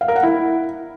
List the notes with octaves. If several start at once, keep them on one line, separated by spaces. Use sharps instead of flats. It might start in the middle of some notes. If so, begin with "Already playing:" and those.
F5
A#4
F#5
E4